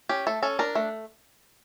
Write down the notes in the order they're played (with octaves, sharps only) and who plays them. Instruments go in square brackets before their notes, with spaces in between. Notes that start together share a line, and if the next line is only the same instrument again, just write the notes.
[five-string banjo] C#4 G4
A3 A4
C#4 A4
D4 A#4
A3